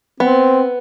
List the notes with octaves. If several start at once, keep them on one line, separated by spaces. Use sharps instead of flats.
B3 C4